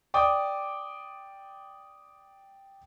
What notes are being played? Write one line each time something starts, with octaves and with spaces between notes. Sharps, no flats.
D5 G5 D6 D#6